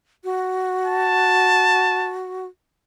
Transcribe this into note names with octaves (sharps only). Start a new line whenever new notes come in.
F#4
A5